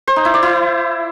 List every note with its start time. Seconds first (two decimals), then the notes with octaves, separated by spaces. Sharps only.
0.07 C5
0.16 D#4
0.25 E4
0.34 D5
0.43 E4